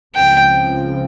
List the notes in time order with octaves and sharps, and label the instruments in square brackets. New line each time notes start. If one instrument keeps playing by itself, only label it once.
[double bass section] C#2 C#3 F3 C4 [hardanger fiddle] G5